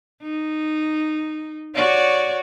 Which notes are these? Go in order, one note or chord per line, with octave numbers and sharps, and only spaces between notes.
D#4
F#4 C#5 D5